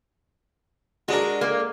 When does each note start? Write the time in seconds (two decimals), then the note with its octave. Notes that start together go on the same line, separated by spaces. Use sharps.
1.08 G#3 D4 F#4 A#4
1.41 A#3